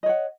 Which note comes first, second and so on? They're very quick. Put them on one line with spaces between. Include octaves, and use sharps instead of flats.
D#5 C#5 F#5